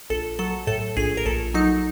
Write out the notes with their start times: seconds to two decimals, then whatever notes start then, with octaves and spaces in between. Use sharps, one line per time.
0.10 A#1 A4
0.39 F#3 A4
0.67 A2 A4
0.97 A#1 G#4
1.17 A#4
1.26 A#1 A4
1.54 F#3 D#4